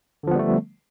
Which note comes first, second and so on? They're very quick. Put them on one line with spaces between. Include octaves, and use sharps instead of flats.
D3 F3 B3 G3 A3